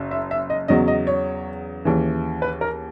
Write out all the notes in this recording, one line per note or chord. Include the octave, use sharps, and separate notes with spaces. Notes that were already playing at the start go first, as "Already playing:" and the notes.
Already playing: F#1 F#2
E5
E5
D#5
E2 C#3 F#3 D#5
D#5
C#5
D#2 C#3 E3
B4
A#4